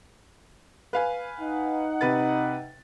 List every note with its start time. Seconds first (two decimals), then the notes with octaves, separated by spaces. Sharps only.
0.93 B4 F5 G#5
1.40 D#4 F#5
2.01 C3 B4 A6